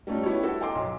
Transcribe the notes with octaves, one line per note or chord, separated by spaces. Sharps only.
G3 A3 C#4 D#4 F4
B3 E4 G4 C#5
E4 F#4 A4
D#5 G5 G#5 A#5 C6 D6
B1